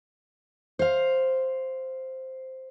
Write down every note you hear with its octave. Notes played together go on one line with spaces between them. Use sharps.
C5 F5